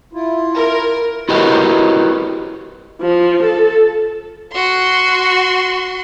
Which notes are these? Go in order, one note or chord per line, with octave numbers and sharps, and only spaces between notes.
E4 F4
A#4
E4 F#4 G4 A#4 B4 D#5
F3
A4
F#4 C6